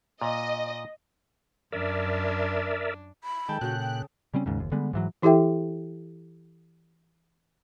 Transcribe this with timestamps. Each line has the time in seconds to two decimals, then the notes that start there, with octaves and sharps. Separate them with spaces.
0.22 A#2 D#5
1.72 F#2 D4 A#4 D5 E5
3.24 B5
3.48 D#3 G#3 A4 G5 A5
3.61 A#2 C#3 F#4 F#6 G6
3.79 G5
4.34 C#3 G3 C4 C#4
4.46 D#2 G#2 C#3
4.59 F#1 D#2
4.72 D3 G3 G#3 B3
4.93 G#2 E3 F#3
5.22 E3 E4 G4 A4 E5 G5